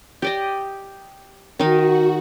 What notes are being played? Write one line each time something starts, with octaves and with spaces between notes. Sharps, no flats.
G4 D5 D#5
D#3 D#4 F#4